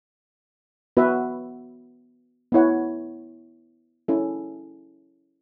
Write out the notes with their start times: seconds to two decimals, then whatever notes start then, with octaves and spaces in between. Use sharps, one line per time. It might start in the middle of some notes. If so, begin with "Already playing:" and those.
0.97 B3 F#4 B4 E5
2.52 B3 E4 C#5 F#5
4.08 C#4 E4 A4